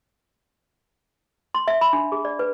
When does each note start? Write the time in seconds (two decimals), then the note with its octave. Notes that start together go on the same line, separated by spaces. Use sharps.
1.55 C6
1.68 E5
1.81 B5
1.93 D4
2.12 G#4
2.25 D5
2.39 B4